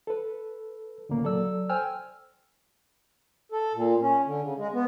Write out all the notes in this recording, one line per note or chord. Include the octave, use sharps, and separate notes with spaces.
A4 B4
D2 A#2 C#3 A#3
F#3 A4 D5 E6
C5 G5 G#5 E6 F6
A4
A#2
C#4
D3
C#3
G#3
B3